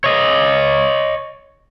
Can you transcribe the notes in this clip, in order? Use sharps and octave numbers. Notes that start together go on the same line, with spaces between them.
C#5 D#5